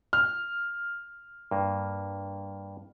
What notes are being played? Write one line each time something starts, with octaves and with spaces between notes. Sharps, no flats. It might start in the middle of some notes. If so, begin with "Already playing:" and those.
F6
G2 A#3